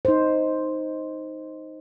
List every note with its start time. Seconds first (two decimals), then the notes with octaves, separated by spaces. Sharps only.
0.05 D#4 C5